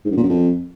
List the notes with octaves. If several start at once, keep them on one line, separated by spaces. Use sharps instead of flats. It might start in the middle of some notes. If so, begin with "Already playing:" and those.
G#2
F#2
A#2
F#2
F2